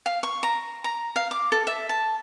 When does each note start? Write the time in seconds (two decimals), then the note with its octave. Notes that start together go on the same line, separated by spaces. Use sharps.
0.06 F5
0.23 C#6
0.43 A#5
0.84 A#5
1.16 F5
1.31 D6
1.52 A4
1.67 E5
1.89 A5